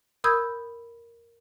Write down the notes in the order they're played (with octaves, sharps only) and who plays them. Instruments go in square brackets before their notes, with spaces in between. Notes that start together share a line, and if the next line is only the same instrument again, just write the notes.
[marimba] A#4 B5 D#6 E6 G6 G#6